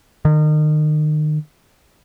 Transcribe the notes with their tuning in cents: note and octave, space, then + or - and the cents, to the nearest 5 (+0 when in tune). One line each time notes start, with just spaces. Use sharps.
D#3 -35